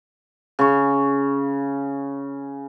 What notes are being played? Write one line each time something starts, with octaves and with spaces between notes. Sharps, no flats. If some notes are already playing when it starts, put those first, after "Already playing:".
C#3 C#6